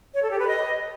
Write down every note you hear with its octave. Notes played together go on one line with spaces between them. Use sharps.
C#5
A4
G4
B4
D#5